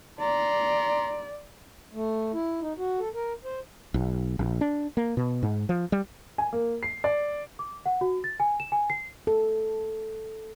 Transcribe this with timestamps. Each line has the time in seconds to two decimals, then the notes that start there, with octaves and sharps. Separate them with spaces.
0.19 D5 A#5 C6
1.93 A3
2.34 E4
2.61 D#4
2.78 F#4
3.00 A4
3.14 A#4
3.45 C5
3.94 B1
4.39 A#1
4.61 D4
4.97 A#3
5.17 B2
5.43 G#2
5.69 F3
5.92 G3
6.38 G#5
6.53 A#3
6.83 C7
7.04 D5
7.59 D6
7.86 F#5
8.01 F#4
8.24 A6
8.40 G#5
8.60 E7
8.72 G#5
8.90 C7
9.27 A4